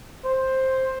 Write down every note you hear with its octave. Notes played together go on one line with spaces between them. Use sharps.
C5